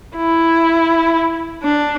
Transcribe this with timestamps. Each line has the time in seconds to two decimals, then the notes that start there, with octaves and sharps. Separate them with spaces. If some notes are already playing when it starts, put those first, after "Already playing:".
0.17 E4
1.63 D4